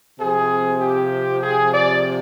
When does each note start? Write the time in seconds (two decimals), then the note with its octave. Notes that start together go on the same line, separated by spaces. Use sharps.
0.20 C3 F3 G#4
0.81 G4
1.41 G#4
1.73 D5